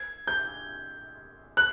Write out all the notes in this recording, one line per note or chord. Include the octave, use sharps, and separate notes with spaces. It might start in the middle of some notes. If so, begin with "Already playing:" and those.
Already playing: G#6
G6
F#6